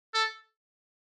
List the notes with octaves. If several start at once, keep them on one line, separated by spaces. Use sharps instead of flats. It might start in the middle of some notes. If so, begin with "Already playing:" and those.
A4